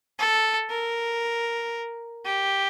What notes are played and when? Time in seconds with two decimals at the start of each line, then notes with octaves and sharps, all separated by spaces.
0.19 A4
0.70 A#4
2.26 G4